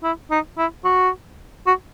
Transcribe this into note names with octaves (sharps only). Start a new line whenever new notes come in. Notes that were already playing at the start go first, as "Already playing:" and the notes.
E4
D#4
E4
F#4
F#4